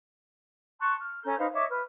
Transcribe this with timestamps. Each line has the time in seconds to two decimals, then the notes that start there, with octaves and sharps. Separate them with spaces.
0.79 A5 C6 C#6 F#6
1.00 F6
1.23 C#4 A4 A#5 G6
1.38 D#4 B4 C5 F5
1.52 C#5 D#5 E5 D6
1.70 B4 F6